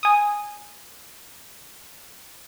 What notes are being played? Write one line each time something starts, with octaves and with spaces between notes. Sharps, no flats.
G#5 D#6